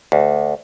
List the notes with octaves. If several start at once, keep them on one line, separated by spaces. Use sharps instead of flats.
D2